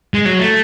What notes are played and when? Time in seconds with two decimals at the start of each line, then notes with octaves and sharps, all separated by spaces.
0.14 G#3
0.25 F#3
0.39 A3